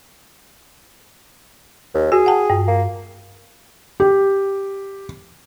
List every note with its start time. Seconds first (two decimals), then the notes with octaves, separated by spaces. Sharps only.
1.94 D#2
2.12 F#4 G#4
2.26 F#5 G5 A5
2.50 G2
2.68 A#3
4.00 G4